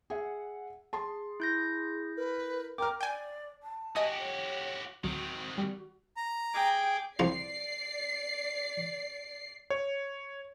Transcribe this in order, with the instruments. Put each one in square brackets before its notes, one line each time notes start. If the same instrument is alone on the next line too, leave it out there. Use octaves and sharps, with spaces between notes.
[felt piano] G#4 E5 [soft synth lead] F#5
[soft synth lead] G#4 [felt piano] A5 C6
[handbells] E4 G6 A#6
[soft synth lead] A#4 [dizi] B4
[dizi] A#4 [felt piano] G5 F6 [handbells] D6
[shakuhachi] D5 [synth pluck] G5 G#5
[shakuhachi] A5
[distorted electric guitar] F#4 G4 [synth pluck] D#5 G#5 D#6
[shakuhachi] C#5
[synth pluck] D2 F#3 [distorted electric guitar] D#3 C4 [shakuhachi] F#4
[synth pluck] G3
[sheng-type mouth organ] A#5
[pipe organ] G#4 D6 [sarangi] G5
[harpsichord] C2 F3 A#5 [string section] D5 C7
[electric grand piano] C#5